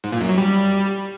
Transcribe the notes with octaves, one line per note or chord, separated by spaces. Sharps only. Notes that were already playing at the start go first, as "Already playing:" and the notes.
G#2
A#2
F#2
F#3
G3